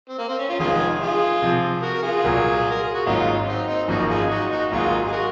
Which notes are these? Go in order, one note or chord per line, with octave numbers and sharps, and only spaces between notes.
C4
A#3
C4
C#4
C#4 F4
F1 F2 D#3 G#3 F4 G#4
F4 G#4
C3 F3 C4
F#4 A#4
A#4
F4 G#4
C2 A#2 F#3 A#3
A#4
G#4
F#4
G#1 G#2 F#3 A#3 C#4 D#4 F4
C4 D#4
C4 D#4
G#1 F#2 F3 A#3 D#4 F#4
F4 G#4
D#4 F#4
D#4 F#4
G#1 G#2 F#3 A#3 F4 G#4
G#4
F#4 A#4